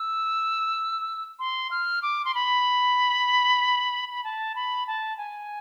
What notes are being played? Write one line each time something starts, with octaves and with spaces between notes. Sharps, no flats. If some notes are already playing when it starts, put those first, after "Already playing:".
Already playing: E6
C6
F6
D6
C6
B5
B5
A5
B5
A5
G#5